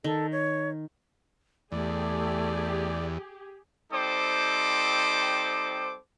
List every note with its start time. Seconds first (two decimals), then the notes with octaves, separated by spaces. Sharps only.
0.04 D#3 A4
0.32 C#5
1.72 E2 A3 G4 G#4 D5
3.92 G3 C4 D#4 A4 C5 D6